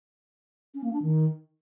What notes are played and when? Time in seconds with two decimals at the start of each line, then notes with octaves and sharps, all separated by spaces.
0.74 C#4
0.84 A#3
0.93 D4
1.02 D#3